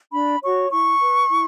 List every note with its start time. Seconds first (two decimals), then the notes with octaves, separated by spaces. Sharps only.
0.13 D4 B5
0.42 F#4 C#5 C#6
0.71 E4 C#6
1.01 B4
1.30 E4